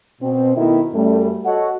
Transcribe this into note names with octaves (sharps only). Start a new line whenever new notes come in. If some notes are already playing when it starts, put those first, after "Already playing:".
B2 C4
B2 D#3 A3 B3 E4
F#2 G3 A3
F#4 A4 C#5 D#5 F#5